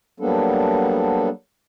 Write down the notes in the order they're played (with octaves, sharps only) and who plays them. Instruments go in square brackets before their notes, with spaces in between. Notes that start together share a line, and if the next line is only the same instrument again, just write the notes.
[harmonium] F#3 G3 A#3 B3 D4 A4